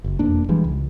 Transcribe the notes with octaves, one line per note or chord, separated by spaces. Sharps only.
F#1
E1 F2 A#3 D4
E3 F3 G3 G#3
C#2